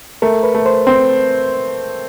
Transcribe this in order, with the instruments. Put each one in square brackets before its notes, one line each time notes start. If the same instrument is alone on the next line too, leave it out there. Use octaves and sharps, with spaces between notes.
[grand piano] A3 [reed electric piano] A#4
[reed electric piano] B4
[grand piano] A3
[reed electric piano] C5
[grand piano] C4 [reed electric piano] C5